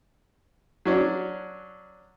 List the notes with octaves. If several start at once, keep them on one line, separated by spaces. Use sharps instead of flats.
F#3 C#4 D4